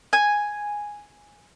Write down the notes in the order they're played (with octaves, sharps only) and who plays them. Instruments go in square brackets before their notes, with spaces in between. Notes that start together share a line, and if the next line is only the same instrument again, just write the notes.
[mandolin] G#5